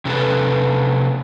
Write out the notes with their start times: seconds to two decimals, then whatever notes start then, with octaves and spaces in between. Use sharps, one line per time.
0.05 C3 C#4 F#4 A4 B4